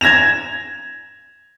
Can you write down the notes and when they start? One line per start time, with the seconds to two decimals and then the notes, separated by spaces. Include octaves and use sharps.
0.01 G#6 A#6 E7 F7